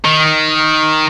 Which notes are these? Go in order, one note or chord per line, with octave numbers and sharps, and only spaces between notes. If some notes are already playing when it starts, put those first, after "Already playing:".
D#3